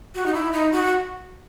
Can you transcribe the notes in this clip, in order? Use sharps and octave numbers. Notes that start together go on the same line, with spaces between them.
F#4
D#4
E4
D#4
F#4